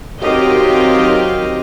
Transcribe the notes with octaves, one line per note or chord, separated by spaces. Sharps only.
D#3 F#3 C4 G4 D#5 F5